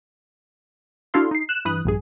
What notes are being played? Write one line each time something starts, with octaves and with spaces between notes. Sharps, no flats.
D4 E4 F#4 A4 F5 C6
D#4 C7
F#6 E7
G2 E3 B4 D#6 F#6
A#1 G2 G#4